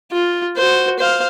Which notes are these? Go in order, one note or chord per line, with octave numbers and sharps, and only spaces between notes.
F4
F#4 C5
C5 F5